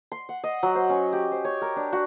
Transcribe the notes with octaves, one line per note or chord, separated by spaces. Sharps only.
C6
F#5
D#5
F#3
C5
C#4
G4
C5
C#5
A#4
D4
F#4